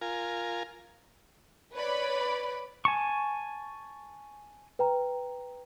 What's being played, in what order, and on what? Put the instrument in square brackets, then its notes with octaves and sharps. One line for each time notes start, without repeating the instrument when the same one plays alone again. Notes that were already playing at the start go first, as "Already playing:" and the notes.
[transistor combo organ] F4 A#4 G#5
[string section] B4 C#5 D5 B5
[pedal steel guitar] G#5 A5 C#6
[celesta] B4 G5 A#5